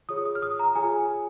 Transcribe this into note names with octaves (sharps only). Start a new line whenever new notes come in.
F4 G#4 C#5 D#6
D#6
F6
D#6
A#5
F4 G#4 C#5 G#5